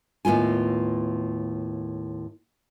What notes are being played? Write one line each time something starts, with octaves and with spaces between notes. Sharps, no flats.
D#2 A2 B3 F4 G#5